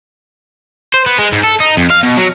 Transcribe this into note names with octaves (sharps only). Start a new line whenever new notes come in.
C5
B3
G#3
G#2
A4
D#4
F2
F5
B2
F#3